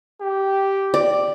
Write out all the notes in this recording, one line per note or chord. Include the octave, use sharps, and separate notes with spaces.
G4
D5